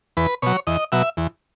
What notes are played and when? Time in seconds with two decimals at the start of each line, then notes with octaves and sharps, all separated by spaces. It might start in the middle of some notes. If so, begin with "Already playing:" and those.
0.17 E2 B4
0.42 B2 F#3 C#5
0.67 E2 D#5
0.92 B2 F#3 E5
1.17 E2